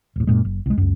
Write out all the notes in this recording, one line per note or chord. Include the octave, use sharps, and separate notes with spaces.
D#1 A2
F#2 A#2 G#3
F#1
C2 G#3
C#2 F#2